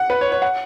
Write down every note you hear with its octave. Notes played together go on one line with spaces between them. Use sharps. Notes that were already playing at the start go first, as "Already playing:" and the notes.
Already playing: F#5
B4
C#5
C#5
F#5